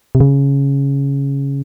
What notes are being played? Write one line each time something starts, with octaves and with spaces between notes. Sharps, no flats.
C3
C#3